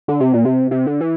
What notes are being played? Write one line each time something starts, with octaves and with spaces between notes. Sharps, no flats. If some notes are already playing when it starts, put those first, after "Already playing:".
D3
C3
A#2
C3
C3
D3
E3